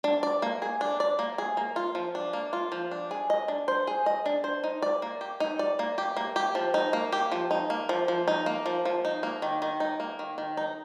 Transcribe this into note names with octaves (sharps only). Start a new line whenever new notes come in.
D4
D5
A#3
G#4
D4
D5
A#3
G#4
A#3
F4
F3
D4
A#3
F4
F3
D4
G#4
D#5
D4
C5
G#4
D#5
D4
C5
D#4
D5
A#3
G4
D#4
D5
A#3
G4
A#3
G4
F3
D#4
A#3
G4
F3
D#4
A#3
F3
F3
D#4
A#3
F3
F3
D#4
A#3
D#3
D#3
D#4
A#3
D#3
D#3
D#4